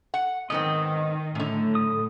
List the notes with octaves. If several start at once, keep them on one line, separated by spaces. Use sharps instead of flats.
F#5
G#2 D#3 B3 C4 D#5
F#2 A2 D3
D#6